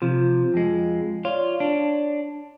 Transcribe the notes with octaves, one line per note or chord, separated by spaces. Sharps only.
C3 F3 F4
F2 G#3
F4 C#5 D5
D4